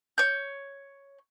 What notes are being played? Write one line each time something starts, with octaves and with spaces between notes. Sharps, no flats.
C#5 G6